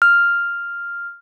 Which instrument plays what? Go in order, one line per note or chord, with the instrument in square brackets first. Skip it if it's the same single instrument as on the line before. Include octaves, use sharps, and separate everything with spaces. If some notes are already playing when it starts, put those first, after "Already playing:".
[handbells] F6